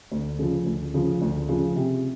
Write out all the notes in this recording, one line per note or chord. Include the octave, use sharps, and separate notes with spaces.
D2
C#3 F3
D2
C#3 F3
D2
C#3 F3
C3